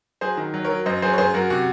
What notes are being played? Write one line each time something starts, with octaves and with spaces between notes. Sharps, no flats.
F#3 G#4 C5
D#3
F#3
A#4 C#5
F#3
F#2 C5 D#5
F#3 G#4 C5
C#5
F#2 G#4 C5
F#2 F#4 A#4
C3 F#4